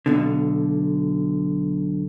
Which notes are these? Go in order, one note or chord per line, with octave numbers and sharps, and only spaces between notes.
B1 B2 D3